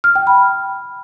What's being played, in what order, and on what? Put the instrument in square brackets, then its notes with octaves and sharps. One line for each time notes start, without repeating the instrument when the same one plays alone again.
[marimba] F6
G5
B5